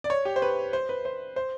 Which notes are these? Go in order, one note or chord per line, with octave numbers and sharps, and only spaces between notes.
D5
C#5
G4
C5
B4
C5
B4
C5
C5